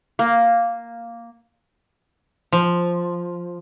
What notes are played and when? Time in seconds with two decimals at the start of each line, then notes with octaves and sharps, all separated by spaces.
0.19 A#3
2.52 F3